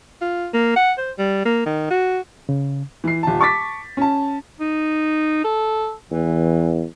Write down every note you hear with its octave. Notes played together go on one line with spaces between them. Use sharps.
F4
A#3
F#5
C5
G3
A#3
D#3
F#4
C#3
E3 C7
D#1 A5
A5 C#6 D6 A6 B6
C#4 A5
D#4
A4
E2 E3